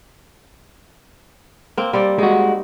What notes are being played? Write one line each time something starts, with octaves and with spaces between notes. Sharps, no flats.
A#3 C4
G3 C4 D5
G#3 D#4 F#4